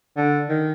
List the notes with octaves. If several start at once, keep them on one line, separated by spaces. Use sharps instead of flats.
D3
D#3